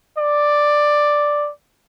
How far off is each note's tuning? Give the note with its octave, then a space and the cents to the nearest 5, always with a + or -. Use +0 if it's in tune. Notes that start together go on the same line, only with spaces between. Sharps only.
D5 +5